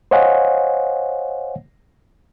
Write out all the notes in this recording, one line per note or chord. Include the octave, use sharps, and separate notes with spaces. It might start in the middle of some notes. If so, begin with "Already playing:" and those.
C5 C#5 D#5 F5 F#5 G#5